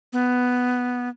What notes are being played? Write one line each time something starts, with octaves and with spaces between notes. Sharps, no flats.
B3